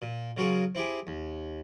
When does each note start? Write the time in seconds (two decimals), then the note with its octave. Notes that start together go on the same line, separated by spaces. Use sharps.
0.02 A#2
0.37 C#3 F#3 F4 F#4 G#4 A#4
0.75 C4 E4 G4 G#4
1.07 D#2